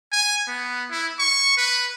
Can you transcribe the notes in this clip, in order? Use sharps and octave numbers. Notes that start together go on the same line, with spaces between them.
G#5
B3
E4
C#6
B4